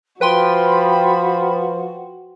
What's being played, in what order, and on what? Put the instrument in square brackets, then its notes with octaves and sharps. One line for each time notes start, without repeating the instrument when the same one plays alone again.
[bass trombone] F3 [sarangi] F#4 [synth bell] B4 G5 C6 [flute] B5